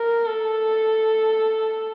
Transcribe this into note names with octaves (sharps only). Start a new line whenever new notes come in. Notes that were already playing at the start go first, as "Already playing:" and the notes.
Already playing: A#4
A4